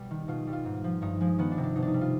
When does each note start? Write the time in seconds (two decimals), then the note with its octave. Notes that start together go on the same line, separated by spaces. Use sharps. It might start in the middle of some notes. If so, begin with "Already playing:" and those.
Already playing: B2 G3
0.11 D#3
0.28 B2 F4
0.47 G3
0.53 F4
0.65 G#2
0.84 F3
1.02 G2 D#4
1.21 F3 G#3
1.39 D#3 B3
1.51 D4
1.58 C3
1.63 D4
1.76 B2 D#4
1.82 D4
1.88 D#4
1.94 G3
2.01 F4